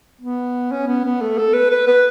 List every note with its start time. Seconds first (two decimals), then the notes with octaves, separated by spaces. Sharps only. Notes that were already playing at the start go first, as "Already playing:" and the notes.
0.21 B3
0.72 C#4
0.87 B3
1.05 B3
1.21 A3
1.37 A4
1.53 B4
1.71 B4
1.87 B4